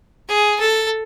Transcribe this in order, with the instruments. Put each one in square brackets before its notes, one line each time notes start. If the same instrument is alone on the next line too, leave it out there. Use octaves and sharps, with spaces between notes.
[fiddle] G#4
A4